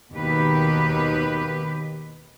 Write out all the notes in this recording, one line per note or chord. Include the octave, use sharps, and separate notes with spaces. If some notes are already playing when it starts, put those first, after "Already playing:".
D#2 B2 D#3 G4 B4